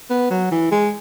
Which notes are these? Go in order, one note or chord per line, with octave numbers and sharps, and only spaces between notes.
B3
F#3
E3
G#3